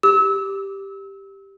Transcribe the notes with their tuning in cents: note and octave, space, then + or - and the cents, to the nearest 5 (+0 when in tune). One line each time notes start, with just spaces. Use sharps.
G4 +0 E6 -30